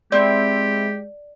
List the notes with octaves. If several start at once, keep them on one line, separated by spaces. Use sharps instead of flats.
G#3 C4 E4 G4 D5